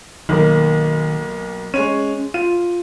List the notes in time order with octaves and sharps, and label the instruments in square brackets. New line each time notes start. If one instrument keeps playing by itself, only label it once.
[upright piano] B1 A#3 A#4 [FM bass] D#3
[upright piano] G#3 C#5 D#7 [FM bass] C#4
[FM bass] F4 [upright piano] D#7